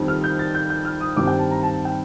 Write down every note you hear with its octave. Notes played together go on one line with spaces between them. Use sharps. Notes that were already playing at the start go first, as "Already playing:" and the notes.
Already playing: F2 D#3 G3 C4 D#4
F6
G6
A6
G6
G6
F6
D#6
G2 D#3 G3 C4 D6
G5
A5
A#5
A5
G5